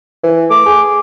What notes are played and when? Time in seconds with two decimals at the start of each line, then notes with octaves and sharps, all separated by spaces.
0.23 E3
0.50 A3 D6
0.66 G#4